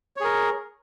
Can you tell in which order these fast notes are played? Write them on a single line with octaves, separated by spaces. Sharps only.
C#5 G#4 A#4